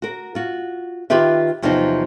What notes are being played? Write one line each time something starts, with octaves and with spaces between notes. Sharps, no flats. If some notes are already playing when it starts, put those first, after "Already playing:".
F#4 A#4
F4 F#4
D#3 F4 G4 B4 E5
E2 C3 F3 F#3 C4 D#4